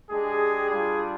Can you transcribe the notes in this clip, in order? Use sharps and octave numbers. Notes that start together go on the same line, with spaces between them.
G#3 D4 G4 G#4
G3 D4 F4 G#4